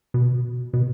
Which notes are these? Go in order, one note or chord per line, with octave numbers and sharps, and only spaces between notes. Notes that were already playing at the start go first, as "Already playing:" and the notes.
B2
B2